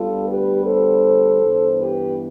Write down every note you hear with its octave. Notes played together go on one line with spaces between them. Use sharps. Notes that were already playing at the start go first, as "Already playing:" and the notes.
Already playing: D2 D3 G3 B3 F4 A4
G4 B4
A4 C5
G2 E3 B3
G4 B4